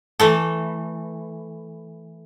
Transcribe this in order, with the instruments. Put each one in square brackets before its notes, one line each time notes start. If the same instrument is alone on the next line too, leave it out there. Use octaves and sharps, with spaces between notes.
[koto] E3 A3 A4